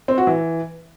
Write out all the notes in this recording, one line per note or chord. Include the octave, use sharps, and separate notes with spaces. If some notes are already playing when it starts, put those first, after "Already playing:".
C4
F#4
E3